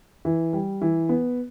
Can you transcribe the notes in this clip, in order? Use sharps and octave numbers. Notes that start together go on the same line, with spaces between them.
E3
G3
E3
B3